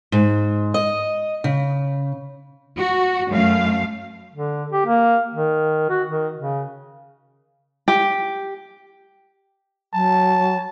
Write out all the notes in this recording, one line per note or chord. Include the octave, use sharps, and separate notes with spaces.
G#2
D#5
C#3
F#4
F#2 A3 F5
D3
G4
A#3
D#3
F#4
D#3
C#3
G4
F#3 A5